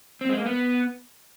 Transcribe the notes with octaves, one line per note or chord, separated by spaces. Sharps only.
C4
G#3
A#3
B3